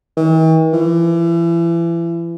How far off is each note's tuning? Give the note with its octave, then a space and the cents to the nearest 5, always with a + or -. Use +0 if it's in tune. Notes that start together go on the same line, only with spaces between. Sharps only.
E3 -45
E3 +35